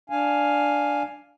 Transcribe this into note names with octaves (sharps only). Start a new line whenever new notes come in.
D4 F5 G#5